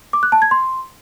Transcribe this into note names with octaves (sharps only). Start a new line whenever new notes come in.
D6
F#6
A5
G#6
C6